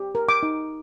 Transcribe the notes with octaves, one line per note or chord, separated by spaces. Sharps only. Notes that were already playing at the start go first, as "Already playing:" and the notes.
Already playing: G4
A#4
D6
D#4